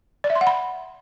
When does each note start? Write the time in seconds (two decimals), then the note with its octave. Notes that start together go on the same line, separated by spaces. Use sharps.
0.24 D5
0.30 E5
0.35 C6
0.41 F#5
0.47 B5